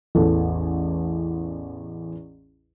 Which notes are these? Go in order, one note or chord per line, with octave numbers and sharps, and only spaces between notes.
A1 E2 A4